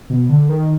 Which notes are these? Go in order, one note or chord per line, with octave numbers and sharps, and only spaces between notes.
B2
D3
D#3